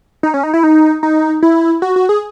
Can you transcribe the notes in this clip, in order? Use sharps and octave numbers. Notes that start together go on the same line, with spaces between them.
D#4
C#4
D#4
E4
D#4
D#4
E4
F#4
F#4
G#4